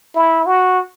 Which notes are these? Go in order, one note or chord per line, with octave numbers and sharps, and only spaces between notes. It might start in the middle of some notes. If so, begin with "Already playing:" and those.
E4
F#4